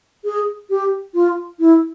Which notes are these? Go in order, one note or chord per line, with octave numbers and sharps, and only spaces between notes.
G#4
G4
F4
E4